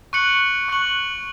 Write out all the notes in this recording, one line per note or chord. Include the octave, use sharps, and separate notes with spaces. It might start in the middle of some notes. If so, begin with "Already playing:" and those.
C#6 F#6 C#7 F#7
C#6 F#6 C#7 F#7